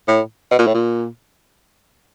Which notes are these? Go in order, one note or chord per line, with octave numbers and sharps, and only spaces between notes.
A2
B2
A#2
A2
A#2